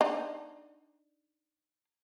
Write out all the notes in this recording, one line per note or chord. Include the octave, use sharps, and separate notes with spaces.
D4 D#4